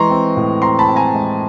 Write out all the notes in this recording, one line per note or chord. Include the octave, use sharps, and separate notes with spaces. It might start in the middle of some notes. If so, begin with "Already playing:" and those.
Already playing: E3 G#3 A#5 C6 C#6
C4
A2
C4 A#5 C6
A5 B5
C4
G#5 A#5
G#3